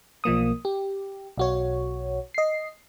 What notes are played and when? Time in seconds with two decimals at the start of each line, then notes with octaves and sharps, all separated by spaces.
0.24 B1 F3 A#3 D#6
0.65 G4
1.38 B1 F#4 C#5
2.34 D#5 C7